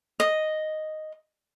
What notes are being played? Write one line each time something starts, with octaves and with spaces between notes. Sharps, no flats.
D#5